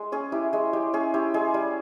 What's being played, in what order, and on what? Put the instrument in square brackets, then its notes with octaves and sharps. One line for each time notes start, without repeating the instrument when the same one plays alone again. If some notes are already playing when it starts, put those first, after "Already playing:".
Already playing: [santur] G#3
C#4 G#4
E4 G4
G#3 G#4
G#3 G4
C#4 G#4
E4 G4
G#3 G#4
G3